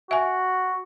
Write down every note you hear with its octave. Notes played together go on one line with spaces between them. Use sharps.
F#4 E5 G#5